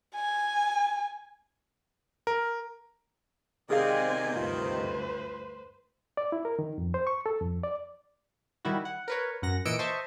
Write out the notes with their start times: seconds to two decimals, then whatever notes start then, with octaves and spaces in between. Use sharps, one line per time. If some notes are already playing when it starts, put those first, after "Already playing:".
0.15 G#5
2.27 A#4
3.70 C3 D#3 G#3 C4 G#4 D5 F5 G#5
4.36 D2 G2 A3 F4 B4 C5
6.17 D5
6.32 E4
6.45 A#4
6.59 D#3
6.78 F2
6.94 C5
7.07 C#6
7.26 A4
7.40 F2
7.63 D5
8.65 D#3 G3 E4 F#4
8.85 F#5
9.08 A#4 B4 C#5
9.42 F#2 F#5 A#6
9.65 A#2 E3 D#5 E6 C#7 D7
9.79 C5 D#5 E5 A5 C#6